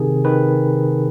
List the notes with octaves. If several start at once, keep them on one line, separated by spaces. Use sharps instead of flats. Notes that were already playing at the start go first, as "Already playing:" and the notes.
Already playing: C3 D#3 G#4
D#3 B4